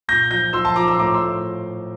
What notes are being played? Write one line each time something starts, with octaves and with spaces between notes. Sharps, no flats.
A#2 G6 A#6
F3 G6 A#6
F3 C6 E6
A5 C6
F3 A#5 D6
C6 E6
A2 A#5 D6
C6 E6
A2